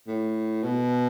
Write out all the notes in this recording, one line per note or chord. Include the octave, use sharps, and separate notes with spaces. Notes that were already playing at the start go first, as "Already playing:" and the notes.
A2
B2